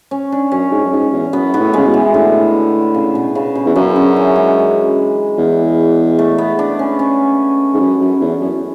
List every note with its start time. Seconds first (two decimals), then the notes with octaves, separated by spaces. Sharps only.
0.11 C#4
0.32 D4
0.51 F#2 C#4
0.72 G#2
0.85 F#2
0.93 G#2
1.13 E2
1.33 F#2 B3
1.54 G#2 B3
1.60 A2
1.73 C#3 G#3
1.87 B2
1.94 E3
2.14 A2 D3
2.94 C#3
3.15 B2
3.35 C#3
3.55 B2
3.66 E2
3.75 F#2 C#3
3.96 D3
4.16 E3
4.36 G#3
5.38 E2
6.19 A3
6.38 B3
6.59 D4
6.79 C#4
6.99 C#4
7.74 G#2
7.80 F#2
8.01 F#2
8.21 E2
8.41 F#2